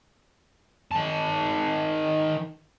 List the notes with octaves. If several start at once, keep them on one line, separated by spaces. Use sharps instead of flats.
D#3 A5